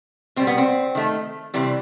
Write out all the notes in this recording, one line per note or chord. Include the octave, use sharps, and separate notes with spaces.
B2 G3 C4
B3
C4
D#3 A3
C3 E3 G3